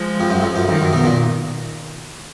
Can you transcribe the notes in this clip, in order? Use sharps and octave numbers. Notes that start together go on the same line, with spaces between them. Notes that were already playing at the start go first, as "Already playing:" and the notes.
Already playing: F3 G#3
F2
F#2
F2
F#2
F2 D#3
F#2
B2
A#2